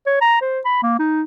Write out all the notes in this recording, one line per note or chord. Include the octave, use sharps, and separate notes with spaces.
C#5
A#5
C5
B5
A#3
D#4